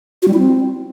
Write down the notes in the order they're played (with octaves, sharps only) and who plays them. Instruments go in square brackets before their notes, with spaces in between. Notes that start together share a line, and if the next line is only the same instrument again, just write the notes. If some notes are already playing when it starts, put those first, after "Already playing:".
[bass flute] F#4
G3
E4
C4